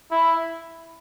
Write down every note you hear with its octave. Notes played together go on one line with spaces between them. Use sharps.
E4